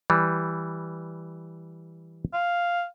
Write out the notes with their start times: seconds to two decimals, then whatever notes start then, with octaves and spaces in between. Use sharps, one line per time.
0.10 E3 G3
2.34 F5